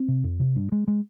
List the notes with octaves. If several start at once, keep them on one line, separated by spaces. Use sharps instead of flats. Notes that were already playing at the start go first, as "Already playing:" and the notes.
Already playing: C4
C3
F2
C3
G2
G#3
G#3